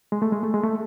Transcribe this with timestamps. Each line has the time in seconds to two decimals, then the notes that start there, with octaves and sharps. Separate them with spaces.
0.12 G#3
0.22 A3
0.32 G#3
0.43 A3
0.54 G#3
0.64 A3